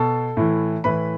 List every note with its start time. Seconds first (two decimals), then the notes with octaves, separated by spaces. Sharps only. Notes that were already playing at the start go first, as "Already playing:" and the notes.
Already playing: B2 A4 A5
0.37 A2 E3
0.84 A2 E3 B4 B5